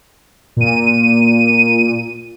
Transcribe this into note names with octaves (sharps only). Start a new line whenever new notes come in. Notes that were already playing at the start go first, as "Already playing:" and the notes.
A#2 D#7